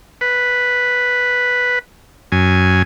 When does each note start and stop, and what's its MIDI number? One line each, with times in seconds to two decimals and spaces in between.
0.21 1.79 71
2.32 2.82 42
2.32 2.82 80